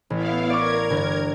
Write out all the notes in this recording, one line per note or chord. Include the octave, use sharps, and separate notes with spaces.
A1 B3 E4 F5
A#4 D5 C#6 D6 G#6
G1